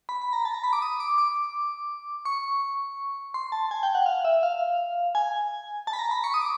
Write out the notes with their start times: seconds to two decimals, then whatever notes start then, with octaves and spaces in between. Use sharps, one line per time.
0.09 B5
0.22 B5
0.33 A#5
0.45 A5
0.54 A#5
0.64 B5
0.73 D6
0.82 D#6
1.00 D6
1.18 D6
2.25 C#6
3.34 C6
3.52 A5
3.71 G#5
3.83 G5
3.95 F#5
4.06 F5
4.25 E5
4.43 F5
5.15 G#5
5.87 A5
5.93 B5
5.99 A#5
6.11 B5
6.24 C#6
6.34 D#6
6.41 D6